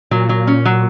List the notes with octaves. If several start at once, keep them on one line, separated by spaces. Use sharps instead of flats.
A#2 F#3
F#3
C#4
F#3